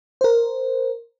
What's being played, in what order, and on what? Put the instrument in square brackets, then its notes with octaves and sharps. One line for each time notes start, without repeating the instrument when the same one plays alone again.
[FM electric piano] A#4 C5